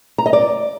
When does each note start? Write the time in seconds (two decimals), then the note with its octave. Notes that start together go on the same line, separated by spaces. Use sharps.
0.18 A#5
0.26 D#5
0.33 D5